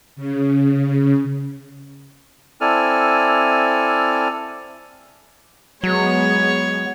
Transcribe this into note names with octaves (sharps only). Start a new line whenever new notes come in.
C#3
C4 E4 A4 D5 G#5 F6
F#3 G#3 B3 C#5